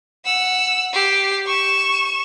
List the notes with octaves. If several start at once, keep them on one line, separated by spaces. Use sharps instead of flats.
F#5 E6
G4 C7
C#6 E7